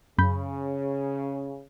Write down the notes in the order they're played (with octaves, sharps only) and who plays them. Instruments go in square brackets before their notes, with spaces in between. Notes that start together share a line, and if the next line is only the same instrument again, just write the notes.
[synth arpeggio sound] F#2 B5 G6 [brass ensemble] C#3